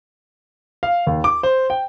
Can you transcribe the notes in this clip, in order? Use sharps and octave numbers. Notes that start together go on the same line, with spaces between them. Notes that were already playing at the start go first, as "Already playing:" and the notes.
F5
D#2
D6
C5
G5